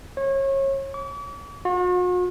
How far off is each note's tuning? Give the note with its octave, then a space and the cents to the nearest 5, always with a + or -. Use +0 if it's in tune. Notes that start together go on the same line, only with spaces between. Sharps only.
C#5 -30
D6 -45
F#4 -45